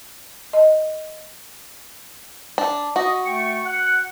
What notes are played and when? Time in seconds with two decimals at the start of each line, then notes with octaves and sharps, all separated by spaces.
0.53 D#5
2.58 D4
2.96 F#4 D#5
3.25 A3 G5 C#6
3.65 F#5